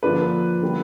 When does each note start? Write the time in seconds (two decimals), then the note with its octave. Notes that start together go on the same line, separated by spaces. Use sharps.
0.03 D3 F3 A#3 D4 B4
0.62 D3 G3 A#3